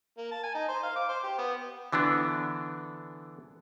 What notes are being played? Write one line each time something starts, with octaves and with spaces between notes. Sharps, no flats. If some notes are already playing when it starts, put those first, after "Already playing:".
A#3
A5
G#5
D#4
C5
F5
D6
C5
G4
B3
D3 E3 B3 D4